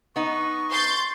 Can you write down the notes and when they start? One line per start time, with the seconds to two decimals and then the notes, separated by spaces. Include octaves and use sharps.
0.16 B3 D#4 C#6
0.71 C6 G6 A6